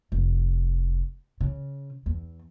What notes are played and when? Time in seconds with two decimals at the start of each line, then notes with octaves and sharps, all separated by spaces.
0.12 F1
1.41 C#3
2.06 E2